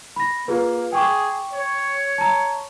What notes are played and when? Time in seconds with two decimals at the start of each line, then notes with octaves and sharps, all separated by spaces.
0.16 B5 A#6
0.48 A#3 F4 G#4 B4
0.93 G#4 G5 C#6 D6
1.53 C#5
2.18 A5 A#5